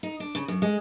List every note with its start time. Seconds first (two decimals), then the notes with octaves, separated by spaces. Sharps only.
0.03 D#4
0.20 D4
0.35 C#3
0.48 F#2
0.62 G#3